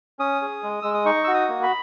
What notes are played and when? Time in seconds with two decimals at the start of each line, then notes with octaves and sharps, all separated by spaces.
0.19 C#4 D#6
0.42 G#4
0.63 G#3
0.82 G#3 E6
0.94 D#6
1.05 D#4 C#6
1.24 F#4 E6
1.34 D#6
1.48 A#3
1.63 B5